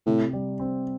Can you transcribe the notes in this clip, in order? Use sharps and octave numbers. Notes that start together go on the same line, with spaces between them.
A2 C3
G3
C4